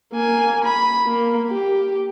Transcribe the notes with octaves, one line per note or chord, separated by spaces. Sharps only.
A#3 G#5
B5
A#3
G4